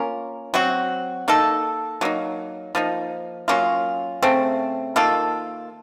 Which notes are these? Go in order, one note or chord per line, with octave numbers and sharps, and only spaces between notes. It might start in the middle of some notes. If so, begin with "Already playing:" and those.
Already playing: A#3 C#4 F4 A#4
F#3 C4 F#4
A#3 D#4 A4
F#3 A#3 D#4
F3 A#3 D#4
F#3 A#3 C#4 F4
C#3 A3 C4
D#3 A#3 F4 A4